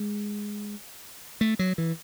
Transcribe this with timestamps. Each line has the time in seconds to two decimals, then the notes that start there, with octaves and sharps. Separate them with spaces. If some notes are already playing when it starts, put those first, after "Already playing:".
Already playing: G#3
1.41 A3
1.59 F#3
1.78 E3